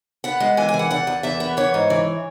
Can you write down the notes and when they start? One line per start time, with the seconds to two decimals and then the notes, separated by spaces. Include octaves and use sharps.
0.24 B3 F#5
0.40 G#3
0.57 E3 G#5
0.69 G#5
0.74 E3
0.79 F#5
0.91 E2 F#5
1.07 E2
1.23 E2 E5
1.40 B3
1.57 E3 C#5
1.74 G#2
1.90 E3